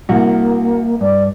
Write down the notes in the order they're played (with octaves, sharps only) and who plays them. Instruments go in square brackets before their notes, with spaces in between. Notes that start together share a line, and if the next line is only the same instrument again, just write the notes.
[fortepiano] C2 [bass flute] A#3 [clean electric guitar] F#4
[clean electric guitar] G2 [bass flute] D5